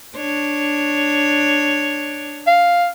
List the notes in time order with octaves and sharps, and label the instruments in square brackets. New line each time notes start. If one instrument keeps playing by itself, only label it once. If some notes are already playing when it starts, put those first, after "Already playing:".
[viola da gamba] D4 C#5
[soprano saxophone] F5